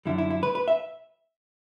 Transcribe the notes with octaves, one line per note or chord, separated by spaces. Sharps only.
F#2 D3 G3 E4
E4
E4
B4
B4
E5